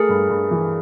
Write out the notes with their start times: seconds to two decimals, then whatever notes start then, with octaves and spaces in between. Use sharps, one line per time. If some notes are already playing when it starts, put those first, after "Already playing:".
Already playing: A3 G#4 A#4
0.09 G2
0.30 G2
0.51 E3